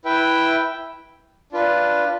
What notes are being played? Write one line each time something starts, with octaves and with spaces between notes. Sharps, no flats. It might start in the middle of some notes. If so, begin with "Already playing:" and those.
E4 B4 E5 G5
D4 F4 B4